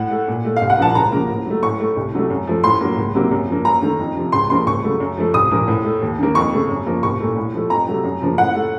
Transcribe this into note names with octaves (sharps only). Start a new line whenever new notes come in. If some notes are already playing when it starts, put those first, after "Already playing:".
Already playing: A2 F#5
A3
A#2
A3
F5
C2
F#5
A#2 F3 A#3 A5
C#2 A#5
C#3 F3 A#3
A2
F#3 A3
A2 C#6
A3
C2
C3 F#3 A3
F#2
F3 A3
A2 C6
F#3 A#3
C#2
C3 F#3 A#3
F#2
F3 A#3
F#2 A#5
D#3 A3
F2
C3 F3
C#2 C6
C#3 F3 A#3 C6
C#2 C#6
C#3 F#3 A3
F#2
F3 A3
C2 D#6
A#2 F3 A#3
A2
A3
D#2
D#3 A#3
F2 C#6
C#3 A3
F#2
F3 A#3
C2 C#6
A#2 A3
A2
F3 A3
F2 A#5
C3 F#3 A3
F#2
C#3 F3 A#3
A2 F#5
A3